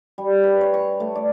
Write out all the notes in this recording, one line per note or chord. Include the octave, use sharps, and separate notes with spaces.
G3
B4
C#5
C#6
A3
D5